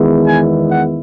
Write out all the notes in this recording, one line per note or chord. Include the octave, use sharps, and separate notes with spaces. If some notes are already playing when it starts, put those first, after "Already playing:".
Already playing: E2 D#3 G#3 B3 E4
G#5
F#5